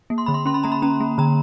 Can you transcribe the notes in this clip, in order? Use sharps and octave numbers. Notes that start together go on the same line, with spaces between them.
A#3
C6
D3 B5
C6
C#4 C6
B5
A#3 A#5
B5
C#4 A#5
A#3
D3 A#5